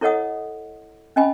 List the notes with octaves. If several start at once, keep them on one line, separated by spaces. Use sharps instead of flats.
E4 A4 C#5 D#5 F#5 D#6
C#4 D#5 G#5 B5